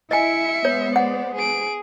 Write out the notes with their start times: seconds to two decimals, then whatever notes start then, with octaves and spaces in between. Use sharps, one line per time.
0.11 E4 D#5 E5 G#5 C#7
0.65 G#3 B3 C5 C#5
0.96 D5 F#5
1.35 G#4 D7